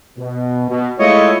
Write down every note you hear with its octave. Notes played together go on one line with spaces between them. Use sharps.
B2
B2
G#3 A3 E4 F4 C#5 D#5